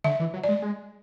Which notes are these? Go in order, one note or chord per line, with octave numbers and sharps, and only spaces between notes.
D3 E5
E3
F#3
G#3 D5
G#3